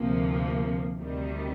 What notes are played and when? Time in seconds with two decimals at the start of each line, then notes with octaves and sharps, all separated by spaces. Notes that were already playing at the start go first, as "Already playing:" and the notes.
Already playing: D2 C3 F3 A#3
0.96 D2 C3 D#3 G3